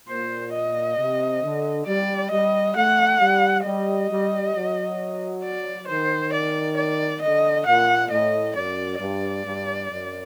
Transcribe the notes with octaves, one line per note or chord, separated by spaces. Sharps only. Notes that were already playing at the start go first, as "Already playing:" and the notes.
A#2 C5
D#5
C3
D3
G3 D5
G3 D#5
A3 F#5
G3
G3 D#5
G3
F#3
D5
D#3 C5
D5
D5
D3 D#5
A#2 F#5
A2 D#5
F#2 D5
G2 D5
G2
F#2